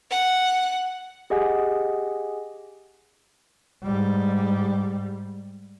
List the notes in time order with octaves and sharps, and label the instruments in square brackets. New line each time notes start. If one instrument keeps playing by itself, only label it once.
[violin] F#5
[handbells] G4 G#4 D#5 F#5 G#5
[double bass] G#2 G3